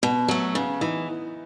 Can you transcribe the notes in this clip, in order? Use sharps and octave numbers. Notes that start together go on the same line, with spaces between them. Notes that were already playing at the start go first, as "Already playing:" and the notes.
B2 B3
F#3 A3 B3
C#3 B3
E3 D#4